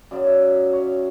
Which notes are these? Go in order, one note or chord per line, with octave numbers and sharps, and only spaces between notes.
F#2 C#3 F#3 D5
E5
E5
C#5